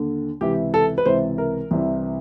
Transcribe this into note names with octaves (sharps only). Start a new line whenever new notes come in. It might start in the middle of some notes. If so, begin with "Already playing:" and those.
Already playing: D#2 D3
C#2 C3 E3 G4
A4
B4
C#2 C3 E3 C5
A#4
C2 C3 E3